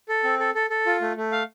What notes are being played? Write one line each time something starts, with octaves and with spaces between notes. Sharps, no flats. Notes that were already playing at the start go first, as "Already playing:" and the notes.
A4
C4
A4
A4
A4
F4
A3
A3
F5